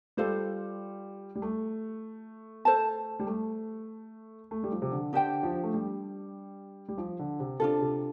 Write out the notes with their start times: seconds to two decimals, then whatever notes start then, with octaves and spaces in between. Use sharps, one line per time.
0.17 G3 F4 A4 C5 F5
1.35 G3
1.42 A3
2.65 A4 C5 A5
3.19 G3
3.27 A3
4.51 A3
4.63 G3
4.72 F3
4.82 C3
4.91 D3
5.13 D3 D4 G4 C5 G5
5.43 F3
5.63 A3
5.74 G3
6.88 G3
6.98 F3
7.19 D3
7.40 C3
7.60 C3 D4 F4 A4
7.81 C3